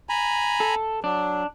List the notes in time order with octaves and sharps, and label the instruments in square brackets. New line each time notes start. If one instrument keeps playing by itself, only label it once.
[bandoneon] G#5 A#5 B5
[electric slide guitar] A4
[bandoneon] F#3 [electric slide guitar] D4